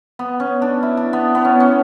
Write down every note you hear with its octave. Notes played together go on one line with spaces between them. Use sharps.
B3
C#4
D4
E4
D4
B3
B3
C#4
C#4